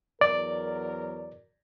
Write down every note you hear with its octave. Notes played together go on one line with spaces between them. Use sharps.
E2 F#3 A#4 D5